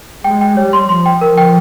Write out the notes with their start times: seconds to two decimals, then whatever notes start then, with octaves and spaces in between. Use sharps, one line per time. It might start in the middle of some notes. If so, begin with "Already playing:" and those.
0.24 G#3 G5
0.41 G5
0.57 G3 C#5
0.73 C6
0.89 F3 C6
1.06 G5
1.21 A#4
1.38 G5